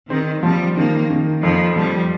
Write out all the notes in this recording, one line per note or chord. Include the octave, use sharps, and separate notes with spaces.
D#3 C4
F3 G3
D#3 A#3
D#3
F2 F3
F3 G3